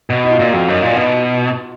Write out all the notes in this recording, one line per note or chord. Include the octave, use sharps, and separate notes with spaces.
B2
D#4
F4
A#2 F#4
F2 F#4
F#2 D#4
A#2 F4
B2 D#4